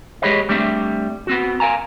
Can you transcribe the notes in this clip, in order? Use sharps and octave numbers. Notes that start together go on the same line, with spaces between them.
G#3 G4 G#4 B4 C#5 D#5
G3 A3 C4 D4 E5
B3 C4 F#4
A#4 F5 G#5 A#5